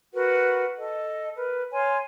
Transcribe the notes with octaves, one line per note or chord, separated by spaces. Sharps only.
F#4 A#4 B4 F#5
A4 D#5
A#4 B4
C#5 F5 G#5 C6